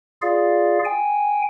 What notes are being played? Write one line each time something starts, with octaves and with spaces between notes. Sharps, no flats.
F4 G#4 D5 F5
G5 G#5